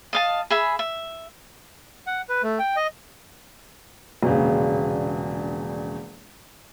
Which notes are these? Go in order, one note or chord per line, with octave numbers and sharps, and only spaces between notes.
D#5 F5 A5
G#4 E5 B5
E5
F#5
B4
A3
G5
D#5
E1 A#1 C#3